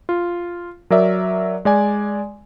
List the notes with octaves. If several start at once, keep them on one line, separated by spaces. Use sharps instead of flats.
F4
F#3 A#4 D5 E5
G#3 D5 G#5